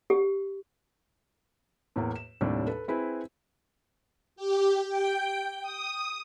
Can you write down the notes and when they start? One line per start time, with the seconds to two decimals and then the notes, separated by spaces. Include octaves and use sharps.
0.10 G4
1.96 E2 A2 A#3
2.16 E7
2.41 D#2 A2 C3 G3 D4
2.67 A4 B4
2.88 C4 E4 G#4 B4
4.36 G4
4.89 G5
5.61 D#6